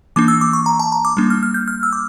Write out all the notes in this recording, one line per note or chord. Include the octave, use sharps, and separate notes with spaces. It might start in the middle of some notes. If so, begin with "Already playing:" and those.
E3 A#3 D4 D6
E6
D6
C#6
A#5
A5
A#5
D6
G3 A#3 D4
F6
F6
G6
F6
E6
D6